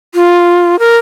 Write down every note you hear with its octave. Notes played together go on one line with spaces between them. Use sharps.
F4
A#4